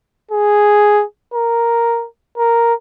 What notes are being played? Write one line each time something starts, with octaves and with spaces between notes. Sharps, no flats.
G#4
A#4
A#4